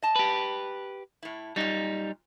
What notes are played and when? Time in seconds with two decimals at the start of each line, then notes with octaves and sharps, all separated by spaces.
0.02 D#5 A5
0.16 G4 B4
1.23 A2 E4
1.56 F#2 A#2 G3 D#4